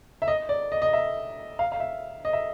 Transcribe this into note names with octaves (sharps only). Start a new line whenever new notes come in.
E5
D#5
D5
D#5
D#5
E5
F5
F5
E5
D#5
E5